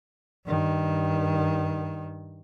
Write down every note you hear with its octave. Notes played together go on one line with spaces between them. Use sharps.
G2 D#3